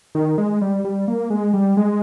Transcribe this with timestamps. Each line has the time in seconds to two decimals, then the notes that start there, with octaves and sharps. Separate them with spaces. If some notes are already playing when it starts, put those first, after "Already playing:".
0.15 D#3
0.38 G#3
0.62 G3
0.85 G3
1.08 A#3
1.30 G#3
1.54 G3
1.77 G#3